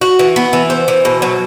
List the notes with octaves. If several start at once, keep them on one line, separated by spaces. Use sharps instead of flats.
F#4
E3
B3
E3
C5
E3
B2
F#3